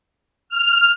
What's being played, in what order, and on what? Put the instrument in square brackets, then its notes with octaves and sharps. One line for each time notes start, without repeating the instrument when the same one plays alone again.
[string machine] F6